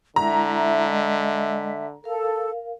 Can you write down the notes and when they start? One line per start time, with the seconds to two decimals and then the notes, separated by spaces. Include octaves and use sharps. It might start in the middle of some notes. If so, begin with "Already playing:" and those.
0.16 D3 G#3 E4 E5 A#5
0.85 G#3 D#5
2.04 A4 A#4 F5